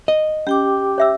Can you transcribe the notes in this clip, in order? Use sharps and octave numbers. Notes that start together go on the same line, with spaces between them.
D#5
C#4 G4 G5 D6
C#5 E5 E6